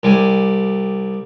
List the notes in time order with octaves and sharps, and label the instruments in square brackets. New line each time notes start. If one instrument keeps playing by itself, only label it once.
[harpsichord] C2 G3 G#5